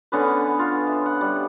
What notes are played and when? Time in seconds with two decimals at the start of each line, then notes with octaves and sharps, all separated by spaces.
0.12 D3 B3 C#4 B4
0.59 F4
0.87 E5
1.06 F#5
1.21 G3